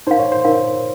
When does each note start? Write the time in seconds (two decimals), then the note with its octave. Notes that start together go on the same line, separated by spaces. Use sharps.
0.07 D#4 A#4 C5 F5
0.19 C#5
0.32 C5
0.44 D#4 A#4 F5